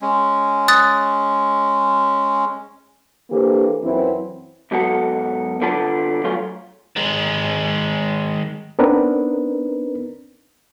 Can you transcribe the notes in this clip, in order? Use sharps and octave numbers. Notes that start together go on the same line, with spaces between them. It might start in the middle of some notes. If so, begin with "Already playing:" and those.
G#3 C#4
D#6 F#6 A6
E3 A#3 D4 G4 A4 C5
F#2 E3 C4 E4
G#2 F#3 B3 F#4 A4
C2 D3 B3 D4 F4 A5
F#3 A3 F4 F#4 G#4
D#3 G#3
B3 C4 D4 D#4 A#4 B4